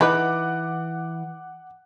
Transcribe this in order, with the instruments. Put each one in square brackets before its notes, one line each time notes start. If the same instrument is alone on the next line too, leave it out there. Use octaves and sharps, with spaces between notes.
[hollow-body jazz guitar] E3 [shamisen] D#4 B4 [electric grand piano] F#5 D6 F#6